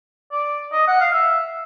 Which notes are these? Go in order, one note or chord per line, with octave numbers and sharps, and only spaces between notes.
D5
D#5
F#5
F5
E5